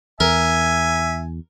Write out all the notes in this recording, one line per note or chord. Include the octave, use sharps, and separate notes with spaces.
E2 A#4 E5 G#5